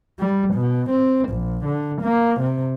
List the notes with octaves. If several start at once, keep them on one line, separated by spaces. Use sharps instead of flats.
G3
B2
C4
A#1
D3
A#3
C3